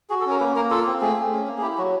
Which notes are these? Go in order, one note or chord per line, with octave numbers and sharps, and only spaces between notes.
F#4 G#4
A4
C#4 A#4
A#3 B4
A#3 A#4
F4 A4
C4
A3 G#4
A3
C#4
A#3
G#4
E4 G4
F#3 F#4